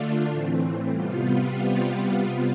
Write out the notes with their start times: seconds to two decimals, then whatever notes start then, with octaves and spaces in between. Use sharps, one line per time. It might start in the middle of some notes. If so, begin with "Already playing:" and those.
Already playing: D3 A3 D4 F4
0.29 A2 E3 A3 C4
0.88 C3 G3 B3 F4